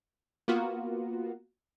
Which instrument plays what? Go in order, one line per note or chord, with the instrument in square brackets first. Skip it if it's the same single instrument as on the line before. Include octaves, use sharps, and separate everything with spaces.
[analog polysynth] A#3 B3 F4 F#4